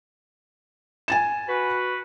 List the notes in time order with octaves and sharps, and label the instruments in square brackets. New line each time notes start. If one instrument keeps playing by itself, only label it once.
[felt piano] G#5 A6 E7
[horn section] F#4 B4